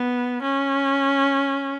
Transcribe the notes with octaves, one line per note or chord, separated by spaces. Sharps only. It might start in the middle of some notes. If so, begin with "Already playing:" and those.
Already playing: B3
C#4